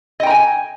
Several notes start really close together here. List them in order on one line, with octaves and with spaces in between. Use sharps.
D#5 G5 A#5 G#5